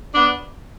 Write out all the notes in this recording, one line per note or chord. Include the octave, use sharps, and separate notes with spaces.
B3 D4